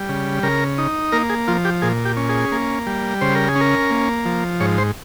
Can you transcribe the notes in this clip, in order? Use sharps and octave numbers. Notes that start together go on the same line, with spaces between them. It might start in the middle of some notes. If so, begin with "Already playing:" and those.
Already playing: G3
C#3
C#3 A#4
D#4
A#3 A#4
G#4
F3 F4
G4
A#2 G#4
G4
C#4
G#4
A#3
G3
C#3 C5
A#4
G#4
C#4 A#4
A#3
F3
G#2 C#5
C5